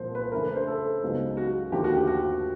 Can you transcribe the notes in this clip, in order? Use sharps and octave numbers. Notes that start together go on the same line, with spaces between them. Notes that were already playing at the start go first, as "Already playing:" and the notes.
Already playing: C2 A#2 F3 C5
B4
C#3 E3 A3 D4 A#4
B4
C5
A4
C#2 C#3 F#3 B3 D#4
F#4
D#2 D3 F3 A3 D4 G4
F#4
G4
F#4